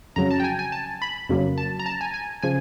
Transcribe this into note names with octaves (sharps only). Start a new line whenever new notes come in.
F2 C#3 F#3 A#5
A5
G5
G#5
G#5
A5
B5
F2 C#3 F#3 A#3
A5
A#5
A5
G#5
G#5
C#3 F3 G#5